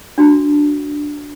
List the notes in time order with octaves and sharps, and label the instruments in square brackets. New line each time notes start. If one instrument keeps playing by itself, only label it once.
[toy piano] D4 F#4